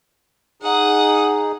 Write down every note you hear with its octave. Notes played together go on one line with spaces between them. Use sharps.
D#4 G#4 F#5 D#6